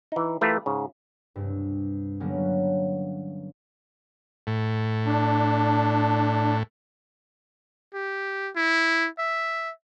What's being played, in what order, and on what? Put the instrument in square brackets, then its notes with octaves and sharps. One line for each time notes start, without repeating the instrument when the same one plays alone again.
[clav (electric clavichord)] E3 D#4
E3 A3 F4 G4 A#4 B4
G#2 C#3
[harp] C2 G2
D3 F#3 G3 A#3 B3 C#4
[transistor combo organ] A2
[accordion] D4
[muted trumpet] G4
E4
E5